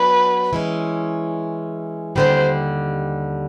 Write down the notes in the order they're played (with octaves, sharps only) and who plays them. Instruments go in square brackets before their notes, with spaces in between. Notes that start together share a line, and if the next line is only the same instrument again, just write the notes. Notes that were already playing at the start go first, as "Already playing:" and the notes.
Already playing: [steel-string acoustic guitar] F#3 B3 D4 [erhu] B4
[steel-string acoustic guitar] E3 G#3 C#4
[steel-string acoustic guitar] D#2 D3 G3 [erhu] C5